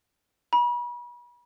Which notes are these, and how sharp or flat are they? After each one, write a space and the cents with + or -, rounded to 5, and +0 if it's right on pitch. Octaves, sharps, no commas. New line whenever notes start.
B5 -40